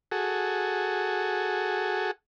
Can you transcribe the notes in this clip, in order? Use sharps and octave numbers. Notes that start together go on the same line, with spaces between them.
F#4 G#4 A4